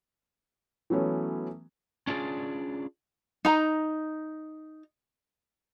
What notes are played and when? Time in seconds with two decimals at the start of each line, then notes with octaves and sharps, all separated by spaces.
0.90 E3 F#3 A3 B3 C#4
2.07 C#4 D4 F4 G#4 D5
3.45 D#4 A#5